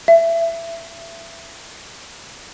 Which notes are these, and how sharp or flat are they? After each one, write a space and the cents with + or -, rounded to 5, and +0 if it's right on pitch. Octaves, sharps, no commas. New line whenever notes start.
E5 +20